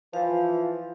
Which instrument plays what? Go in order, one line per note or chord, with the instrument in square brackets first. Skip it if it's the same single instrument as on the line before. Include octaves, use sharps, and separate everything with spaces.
[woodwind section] E3 F3 [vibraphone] F5